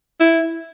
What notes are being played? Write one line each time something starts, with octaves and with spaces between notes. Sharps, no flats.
E4